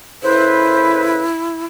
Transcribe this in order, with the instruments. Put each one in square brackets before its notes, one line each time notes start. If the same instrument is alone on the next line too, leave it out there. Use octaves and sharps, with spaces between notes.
[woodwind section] C#3 A4 B4 [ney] E4 [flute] C5